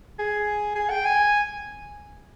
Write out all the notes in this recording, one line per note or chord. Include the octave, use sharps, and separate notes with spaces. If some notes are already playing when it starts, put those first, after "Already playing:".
G#4
G#4
G5
G#5